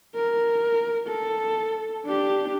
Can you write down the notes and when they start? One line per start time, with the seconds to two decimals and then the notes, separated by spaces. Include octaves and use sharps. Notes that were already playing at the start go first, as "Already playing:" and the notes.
0.15 A#4
1.08 A4
2.05 D4 G4